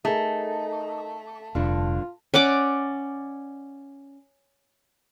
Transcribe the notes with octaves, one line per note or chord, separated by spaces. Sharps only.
A3 D#4 G#4 A#4
F1 G2 D3 D4 F4
C#4 D5 F#5 D6